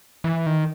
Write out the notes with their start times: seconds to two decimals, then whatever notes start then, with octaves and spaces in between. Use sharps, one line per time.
0.24 E3
0.46 D#3